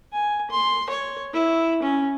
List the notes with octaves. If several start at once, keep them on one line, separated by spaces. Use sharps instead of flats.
G#5
C6
C#5
E4
C#4